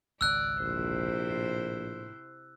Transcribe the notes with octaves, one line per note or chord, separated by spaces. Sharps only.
G#1 C#2 D5 E6 F#6
A#1 C3 E4 C5
A2